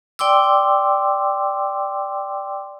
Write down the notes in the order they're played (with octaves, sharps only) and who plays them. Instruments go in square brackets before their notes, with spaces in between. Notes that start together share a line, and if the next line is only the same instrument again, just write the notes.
[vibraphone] D5 G5 C6 D6 E6